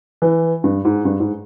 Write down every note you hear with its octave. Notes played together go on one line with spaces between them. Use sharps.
E3
G2
G#2
G2
G#2